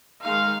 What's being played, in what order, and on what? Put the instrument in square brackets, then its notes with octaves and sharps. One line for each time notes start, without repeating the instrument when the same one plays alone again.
[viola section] D#3 G#3 D#4 F5